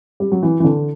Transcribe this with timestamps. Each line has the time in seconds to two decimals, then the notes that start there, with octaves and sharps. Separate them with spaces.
0.20 G3
0.32 F#3
0.43 E3
0.60 E3
0.64 D3